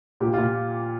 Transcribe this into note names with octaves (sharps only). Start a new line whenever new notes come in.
A#2 G4
A#2 F4